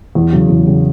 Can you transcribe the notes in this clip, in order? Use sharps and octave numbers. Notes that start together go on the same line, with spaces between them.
E2
C#3 F#3
E2
C#3 F#3